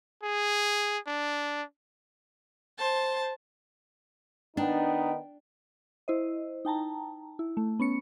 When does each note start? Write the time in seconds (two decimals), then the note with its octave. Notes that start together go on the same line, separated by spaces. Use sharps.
0.23 G#4
1.07 D4
2.78 C5 A5
4.57 D#3 B3 D4 D#4 G5
6.08 E4 C5 D#5
6.65 D#4 G5 A5 A#5
7.39 E4
7.57 A3
7.79 B3 C#4 C#7